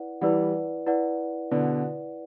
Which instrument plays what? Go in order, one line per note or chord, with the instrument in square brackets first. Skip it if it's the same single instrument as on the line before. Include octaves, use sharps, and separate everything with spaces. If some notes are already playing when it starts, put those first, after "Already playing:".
Already playing: [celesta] E4 B4 D5 F#5
[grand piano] E3 G3 [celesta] E4 B4 D5 F#5
[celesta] E4 B4 D5 F#5
[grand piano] B2 D3 [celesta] E4 B4 D5 F#5